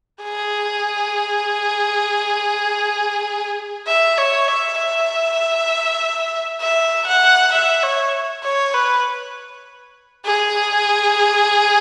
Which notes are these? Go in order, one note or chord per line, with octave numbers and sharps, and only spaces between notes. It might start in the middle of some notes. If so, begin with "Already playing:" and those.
G#4
E5
C#5
E5
E5
E5
F#5
E5
C#5
C#5
B4
G#4